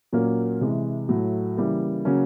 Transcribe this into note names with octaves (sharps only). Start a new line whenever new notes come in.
A#2 F#3 A#3 C#4
C3 E3 G#3
A2 F#3 A3
C#3 E3 G3 A#3
C#3 F#3 A#3 C#4